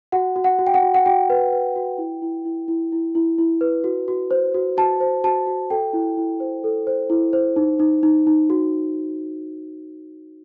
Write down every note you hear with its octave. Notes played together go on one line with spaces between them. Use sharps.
F#4 F#5
F#4
F#5
F#4
G5
F#5
F#4
F#5
F#4 G5
B4
B4
F#4
E4
E4
E4
E4
E4
E4
E4
B4
F#4
F#4
C5
F#4
F#4 A5
C5
F#4 A5
F#4
A4 G5
E4
E4
C5
A4
C5
E4
C5
D#4
D#4
D#4
D#4
F#4